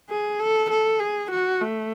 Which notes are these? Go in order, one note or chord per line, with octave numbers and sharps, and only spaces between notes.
G#4
A4
A4
G#4
F#4
A3